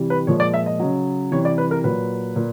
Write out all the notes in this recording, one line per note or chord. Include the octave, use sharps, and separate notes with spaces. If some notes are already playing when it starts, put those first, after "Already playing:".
Already playing: C3 E3 G3
B4
A#2 F3 G#3 C#5
D5
E5
D#5
C#3 F#3
C3 E3 G3 C#5
D5
B4
A#4
A#2 F#3 B4
A#2